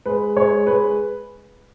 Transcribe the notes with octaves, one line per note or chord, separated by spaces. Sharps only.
G#3 B4
G#3 C#5
G#3 B4